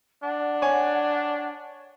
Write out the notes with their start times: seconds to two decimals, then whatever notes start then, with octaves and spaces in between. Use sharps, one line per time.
0.23 D4 F#5
0.62 C#5 G#5